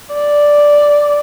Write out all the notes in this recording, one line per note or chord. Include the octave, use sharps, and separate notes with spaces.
D5